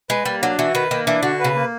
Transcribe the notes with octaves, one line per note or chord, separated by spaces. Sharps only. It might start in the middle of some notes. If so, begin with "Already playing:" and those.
G#3 B4
G3 A#3
F#3 D4
E3 F#4
D#3 B4
D#3 A#3
E3 D4
D3 F#4
C#3 B4
A#3